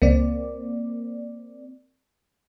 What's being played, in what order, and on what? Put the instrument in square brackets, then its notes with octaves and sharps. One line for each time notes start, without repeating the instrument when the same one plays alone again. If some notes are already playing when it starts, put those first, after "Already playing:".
[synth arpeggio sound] C#2 [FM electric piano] A#3 C4 D5